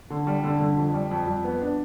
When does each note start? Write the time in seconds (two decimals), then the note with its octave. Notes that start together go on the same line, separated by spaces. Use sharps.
0.10 D3
0.27 G3
0.44 D3
0.60 D3
0.77 F2
0.94 G3
1.11 F2
1.27 F2
1.44 B3
1.61 D4